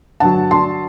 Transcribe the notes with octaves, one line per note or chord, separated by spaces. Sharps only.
G2 D3 F#3 F#5 A5
A5 C6